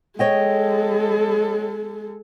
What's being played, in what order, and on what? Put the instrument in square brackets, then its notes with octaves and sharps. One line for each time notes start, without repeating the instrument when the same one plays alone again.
[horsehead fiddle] G#3 A4 [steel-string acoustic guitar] C#5 D#5 G5